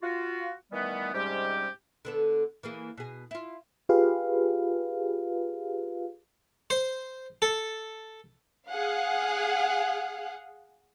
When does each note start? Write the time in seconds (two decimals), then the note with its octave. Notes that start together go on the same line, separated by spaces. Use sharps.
0.02 F4 F#4
0.72 D#3 E3 G3 A3 B3
1.13 G#2 C3 G3 G#3 C#4 G4
2.05 D3 B3 A4
2.63 E3 A#3 G#4
2.97 B2 G#4
3.31 E4 F4
3.89 F4 G4 G#4 B4 F5
6.70 C5
7.42 A4
8.70 G#4 F5 F#5